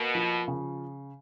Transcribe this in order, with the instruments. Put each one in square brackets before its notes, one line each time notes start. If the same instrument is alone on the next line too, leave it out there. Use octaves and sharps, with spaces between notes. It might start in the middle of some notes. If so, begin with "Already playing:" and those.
Already playing: [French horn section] B2 [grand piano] A#3
[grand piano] F3
C#3